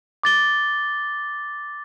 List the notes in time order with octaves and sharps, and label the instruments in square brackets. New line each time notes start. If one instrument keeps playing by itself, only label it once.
[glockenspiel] D6 A6 G7